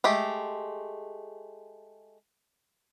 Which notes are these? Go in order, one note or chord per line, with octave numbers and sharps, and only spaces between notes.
G#3 A3 G4